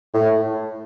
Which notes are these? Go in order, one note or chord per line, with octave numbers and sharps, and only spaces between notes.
A2